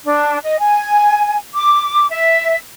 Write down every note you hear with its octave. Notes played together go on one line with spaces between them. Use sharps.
D4
D#5
G#5
D6
E5